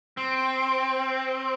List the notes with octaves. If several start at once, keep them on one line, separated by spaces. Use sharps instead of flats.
C4